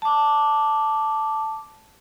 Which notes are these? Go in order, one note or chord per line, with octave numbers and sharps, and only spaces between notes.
A5 D6